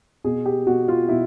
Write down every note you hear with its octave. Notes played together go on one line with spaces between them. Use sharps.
B2 G#4
G4
B2 F#4
F4
B2 E4